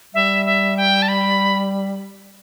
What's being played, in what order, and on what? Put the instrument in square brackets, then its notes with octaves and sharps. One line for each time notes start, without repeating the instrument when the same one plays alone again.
[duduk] G3 [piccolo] E5
[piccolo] E5
G5
A5
B5